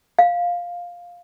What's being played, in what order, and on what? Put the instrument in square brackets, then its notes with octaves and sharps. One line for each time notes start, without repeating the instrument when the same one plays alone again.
[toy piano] F5